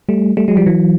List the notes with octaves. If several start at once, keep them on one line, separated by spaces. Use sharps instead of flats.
G3 A3
G3 A3
F#3 G#3
F3 G3
E3 F#3